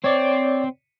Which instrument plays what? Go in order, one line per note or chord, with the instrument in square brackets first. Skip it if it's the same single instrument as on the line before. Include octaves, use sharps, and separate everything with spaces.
[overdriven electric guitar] C4 [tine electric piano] C#5 D5